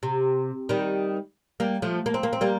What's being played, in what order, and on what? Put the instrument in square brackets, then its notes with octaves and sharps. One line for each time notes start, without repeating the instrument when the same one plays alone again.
[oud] C3
D#3 G3
G3 A#3
F3 A3
A#3
C4
A#3
C4
G3 A#3